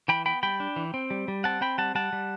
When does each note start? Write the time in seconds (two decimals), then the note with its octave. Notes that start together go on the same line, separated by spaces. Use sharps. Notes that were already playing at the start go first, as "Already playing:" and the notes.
0.08 E3 G5 B5
0.26 B3 G5 B5
0.43 G3 G5 B5
0.60 D4
0.76 E3
0.94 C4
1.10 G3
1.28 G3
1.44 C4 F#5 A5
1.61 C4 G5 B5
1.78 G3 F#5 A5
1.95 G3 F#5 A5
2.13 G3